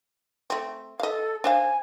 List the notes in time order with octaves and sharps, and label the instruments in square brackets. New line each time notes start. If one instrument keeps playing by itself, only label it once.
[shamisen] A3 C4
[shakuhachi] A4 [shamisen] D#5 F5
[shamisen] D4 C5 F5 [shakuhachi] G#5